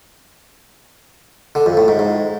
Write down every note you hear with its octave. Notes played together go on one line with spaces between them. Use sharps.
D3
F2
A2
G#2
G#2